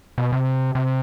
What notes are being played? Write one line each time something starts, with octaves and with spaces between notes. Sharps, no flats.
B2
C3
C3